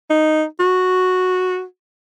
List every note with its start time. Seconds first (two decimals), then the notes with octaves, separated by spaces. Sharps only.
0.10 D#4
0.60 F#4